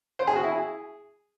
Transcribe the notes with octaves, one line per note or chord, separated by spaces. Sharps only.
C5
G#4
F#4
E4
G#4